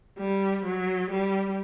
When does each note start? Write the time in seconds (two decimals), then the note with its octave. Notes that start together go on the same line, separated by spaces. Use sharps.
0.18 G3
0.65 F#3
1.11 G3